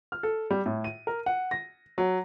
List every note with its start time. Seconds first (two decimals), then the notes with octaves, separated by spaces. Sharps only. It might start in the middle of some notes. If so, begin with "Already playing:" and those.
0.12 F6
0.23 A4
0.51 G3
0.66 A2
0.84 D#7
1.07 A#4
1.26 F#5
1.51 A#6
1.98 F#3